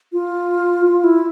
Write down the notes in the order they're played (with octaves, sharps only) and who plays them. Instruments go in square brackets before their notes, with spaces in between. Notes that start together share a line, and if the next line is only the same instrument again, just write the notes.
[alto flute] F4
F4
E4